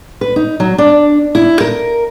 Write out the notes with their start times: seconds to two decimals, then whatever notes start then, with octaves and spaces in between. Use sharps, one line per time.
0.21 B4
0.36 D#4
0.60 F#3
0.78 D4
1.35 E4
1.60 A#4